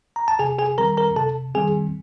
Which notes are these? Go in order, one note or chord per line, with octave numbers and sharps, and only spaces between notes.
A#5
A5
C3 G#4 G#5
G#4 G#5
D#3 G3 C4 A#4 A#5
A#4 A#5
C3 A4 A5
D#3 G3 C4 G#4 G#5